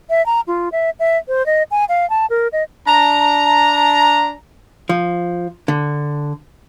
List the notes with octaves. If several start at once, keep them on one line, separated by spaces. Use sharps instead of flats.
E5
A#5
F4
E5
E5
C5
D#5
G#5
F5
A5
A#4
D#5
D4 A#5
F3
D3